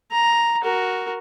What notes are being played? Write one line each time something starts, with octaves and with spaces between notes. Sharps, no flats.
A#5
F#4 A#4